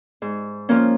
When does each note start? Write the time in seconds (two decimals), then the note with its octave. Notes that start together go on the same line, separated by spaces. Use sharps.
0.22 G#2
0.69 F3 A#3 C#4